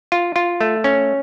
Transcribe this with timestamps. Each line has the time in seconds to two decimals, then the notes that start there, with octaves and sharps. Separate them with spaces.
0.12 F4
0.36 F4
0.61 A3
0.84 C#4